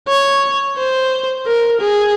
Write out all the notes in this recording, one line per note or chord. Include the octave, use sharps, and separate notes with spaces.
C#5
C5
A#4
G#4